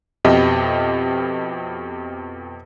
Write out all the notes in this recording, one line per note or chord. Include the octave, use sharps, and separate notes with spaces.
F2 B2 G4 D#5 E5